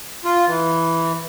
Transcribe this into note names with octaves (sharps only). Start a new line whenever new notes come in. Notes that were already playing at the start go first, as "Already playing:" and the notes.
F4
E3